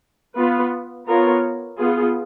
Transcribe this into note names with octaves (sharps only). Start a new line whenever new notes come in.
B3 F4 B4
B3 F4 A#4 C#5
B3 F4 G#4